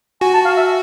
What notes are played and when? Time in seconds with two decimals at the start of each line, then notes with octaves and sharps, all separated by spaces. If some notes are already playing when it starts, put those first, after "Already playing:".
0.21 F#4 G#5
0.33 A5
0.45 F5
0.57 E5